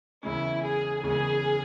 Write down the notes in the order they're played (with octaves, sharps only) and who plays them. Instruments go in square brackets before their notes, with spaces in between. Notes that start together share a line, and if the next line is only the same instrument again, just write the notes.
[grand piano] F#1 E2 C#3 G#3 C#4 [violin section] E4
[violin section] G#4
[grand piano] F#1 E2 C#3 G#3 C#4 [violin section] G#4